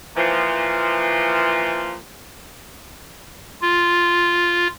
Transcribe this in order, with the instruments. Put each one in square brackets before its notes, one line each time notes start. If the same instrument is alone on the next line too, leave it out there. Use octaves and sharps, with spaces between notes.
[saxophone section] A#2 E3 F3
[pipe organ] F4